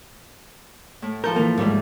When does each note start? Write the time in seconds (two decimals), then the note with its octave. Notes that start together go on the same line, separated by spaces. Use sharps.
1.02 A2
1.24 F3 A4 A#4 G6
1.36 E3 A#3
1.58 D#2 G#2 G3 A3